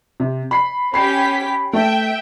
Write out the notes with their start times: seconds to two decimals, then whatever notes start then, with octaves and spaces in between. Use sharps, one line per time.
0.20 C3
0.51 B5 C7
0.94 C#4 G4 B5 B6 C7
1.73 A3 E5 G5